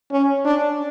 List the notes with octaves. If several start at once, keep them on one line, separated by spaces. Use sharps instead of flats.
C#4
D4